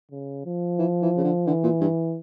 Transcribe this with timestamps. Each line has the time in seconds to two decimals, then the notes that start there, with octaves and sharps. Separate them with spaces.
0.12 C#3
0.45 F3
0.79 E3
1.02 E3
1.17 C#3
1.24 D3
1.47 D3 E3
1.64 A#2
1.81 G2